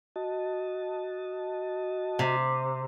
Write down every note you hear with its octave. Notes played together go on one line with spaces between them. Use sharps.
F#4 D#5 A5
C3